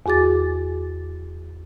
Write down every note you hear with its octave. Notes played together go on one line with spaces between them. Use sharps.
E2 F#4 G#4 D6 A6